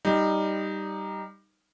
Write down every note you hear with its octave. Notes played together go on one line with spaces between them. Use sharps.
G3 D#4